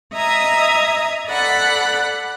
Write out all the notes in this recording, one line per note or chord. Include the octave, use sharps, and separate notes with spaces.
D#5 E5 A#5 D#6 G#6
A4 D5 F#5 B5 F#6